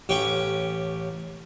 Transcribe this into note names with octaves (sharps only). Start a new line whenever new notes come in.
A1 C#4 G4 G5 C#6